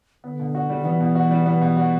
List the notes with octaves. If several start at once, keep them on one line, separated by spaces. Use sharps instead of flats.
D3 B3
B2
F#4
G3
E3 B3
B2
F#4
G3
B3
B2
F#4